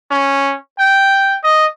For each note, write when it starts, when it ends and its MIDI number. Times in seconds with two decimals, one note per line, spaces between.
0.11 0.55 61
0.79 1.35 79
1.44 1.65 75